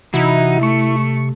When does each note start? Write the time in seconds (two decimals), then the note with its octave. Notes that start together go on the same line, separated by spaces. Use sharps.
0.14 C3 E3 D#4 E4 F#4
0.63 A3 C#6